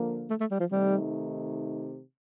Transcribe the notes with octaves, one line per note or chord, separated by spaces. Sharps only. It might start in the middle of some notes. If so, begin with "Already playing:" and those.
Already playing: D3 F3 A#3
A3
A3
G3
F3
C3 D#3 G3 A3 D#4